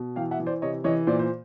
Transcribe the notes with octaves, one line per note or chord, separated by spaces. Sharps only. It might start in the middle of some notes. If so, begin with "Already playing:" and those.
Already playing: B2
E3 F5 G5
E5 F#5
E3
C5 D5
C3 C#5 D#5
E3 C#5 D#5
A#2 C5 D5
C5